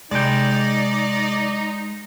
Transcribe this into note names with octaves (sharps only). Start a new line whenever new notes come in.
C3 F#3 G#3 D#4 D5 G5